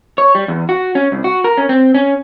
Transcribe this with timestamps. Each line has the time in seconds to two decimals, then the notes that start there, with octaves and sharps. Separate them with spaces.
0.18 C#5
0.35 G3
0.48 E2
0.69 F#4
0.95 C#4
1.12 C2
1.24 F#4
1.44 A#4
1.57 C#4
1.69 C4
1.95 C#4